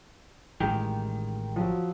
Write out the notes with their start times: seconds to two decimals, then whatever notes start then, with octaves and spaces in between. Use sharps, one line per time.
0.60 A1 A2 D#3 G#3 G4
1.56 F3 F#3